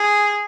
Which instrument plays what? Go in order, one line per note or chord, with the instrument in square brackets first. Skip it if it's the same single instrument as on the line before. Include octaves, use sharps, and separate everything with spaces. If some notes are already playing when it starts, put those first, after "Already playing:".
Already playing: [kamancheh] G#4